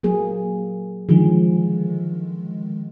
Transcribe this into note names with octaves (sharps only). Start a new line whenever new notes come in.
F#3 A#3 G#4
D3 D#3 F3 G#3 G#4